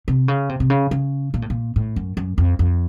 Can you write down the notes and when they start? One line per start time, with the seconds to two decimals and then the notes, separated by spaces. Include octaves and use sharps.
0.08 C3
0.28 C#3
0.49 C3
0.60 C3
0.70 C#3
0.91 C#3
1.34 A#2
1.42 A2
1.50 A#2
1.76 A2
1.96 F#2
2.17 F#2
2.38 F2
2.59 F2